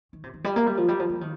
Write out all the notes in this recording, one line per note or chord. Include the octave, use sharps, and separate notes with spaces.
D#3
C3
D#3
G3
A#3
G3
F3
G3
F3
F3
D#3